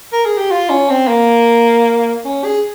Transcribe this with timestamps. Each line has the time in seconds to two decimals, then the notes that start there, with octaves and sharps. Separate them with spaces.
0.13 A#4
0.26 G#4
0.37 G4
0.51 F4
0.70 C#4
0.89 C4
1.08 A#3
2.25 C#4
2.44 G#4